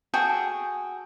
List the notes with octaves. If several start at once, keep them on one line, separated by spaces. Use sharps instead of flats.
F#4 G#4 A4 G5